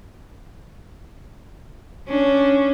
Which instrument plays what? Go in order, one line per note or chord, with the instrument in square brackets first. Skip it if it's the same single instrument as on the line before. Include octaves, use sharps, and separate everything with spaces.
[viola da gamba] C#4 D4